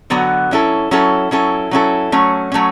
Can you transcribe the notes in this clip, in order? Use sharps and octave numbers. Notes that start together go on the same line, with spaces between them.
D3 F#3 B3 F#4
F#3 C#4 E4 A4
F#3 C#4 E4 A4
F#3 C#4 E4 A4
F#3 C#4 E4 A4
F#3 A3 C#4
F#3 A3 C#4